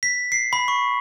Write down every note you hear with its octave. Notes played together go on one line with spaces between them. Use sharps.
B6
C7
B5
C#6